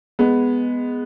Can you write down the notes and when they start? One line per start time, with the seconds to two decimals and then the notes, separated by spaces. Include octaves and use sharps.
0.19 G#3 B3